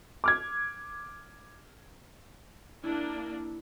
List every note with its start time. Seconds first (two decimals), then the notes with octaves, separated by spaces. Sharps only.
0.24 D6 F6 G#6
2.84 A#3 D4 E4